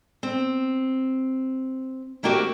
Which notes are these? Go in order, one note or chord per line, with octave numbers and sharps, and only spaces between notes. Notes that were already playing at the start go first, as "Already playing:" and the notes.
C4
A3 A#3 C4 D4 F#4 G4